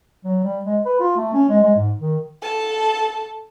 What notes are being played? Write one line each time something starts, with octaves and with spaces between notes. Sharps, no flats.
F#3
G3
G#3
B4
F4
A3
C#4
G#3
G#3
G#2
D#3
A4 A5